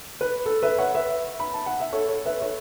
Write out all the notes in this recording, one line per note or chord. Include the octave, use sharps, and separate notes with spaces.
B4
A4
B4 E5
C#5 F#5
B4 E5
B5
A5
F#5
E5
A4 C#5
A4 C#5
B4 E5
A4 C#5